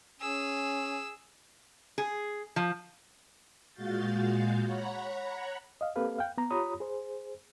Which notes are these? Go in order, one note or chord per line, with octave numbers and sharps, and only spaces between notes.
C#4 G#4 E6
G#4
F3
A#2 G#3 F#4 F5 G6 A6
C#5 F#5 A#5 B5
D#5 F5
A#3 C4 G4 A4 B4 F5
F5 G5
B3 A#5
F4 G4 C#5 A#5 B5 D#6
G#4 C5